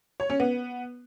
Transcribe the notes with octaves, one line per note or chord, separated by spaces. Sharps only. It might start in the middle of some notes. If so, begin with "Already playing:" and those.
C#5
C#4
B3